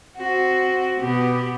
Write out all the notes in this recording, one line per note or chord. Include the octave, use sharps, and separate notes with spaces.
C4 F#4
B2 B3 G4